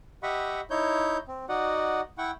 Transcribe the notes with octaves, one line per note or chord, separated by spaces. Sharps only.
G4 D#5 E5 F#5 B5 C#6
D#4 E4 C#5 G6
C4
D#4 F#4 D5 D#5 F#5
E4 F#5 G5 C#6